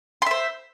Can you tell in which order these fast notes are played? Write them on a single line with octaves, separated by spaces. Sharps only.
C6 E5 C5